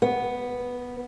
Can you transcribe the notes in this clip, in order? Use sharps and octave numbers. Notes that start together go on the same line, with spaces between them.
B3